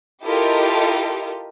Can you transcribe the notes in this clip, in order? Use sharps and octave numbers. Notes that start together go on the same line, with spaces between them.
E4 F4 G4 A4 A#4 D#5